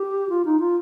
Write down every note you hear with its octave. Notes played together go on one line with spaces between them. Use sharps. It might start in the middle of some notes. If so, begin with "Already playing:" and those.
Already playing: G4
F4
D#4
F4